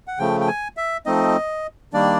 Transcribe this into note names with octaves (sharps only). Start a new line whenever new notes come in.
F#5
C#3 F3 A3 G5
G5
G#5
E5
F3 A3 C4 D#4 D#5
D#3 G3 A#3 D4 D5